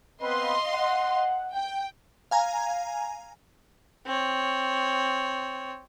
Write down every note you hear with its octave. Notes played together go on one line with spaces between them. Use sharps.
B3 C4 B4 D#5 F5 C6
F#5
G5
F5 G#5 A#5
C4 C#5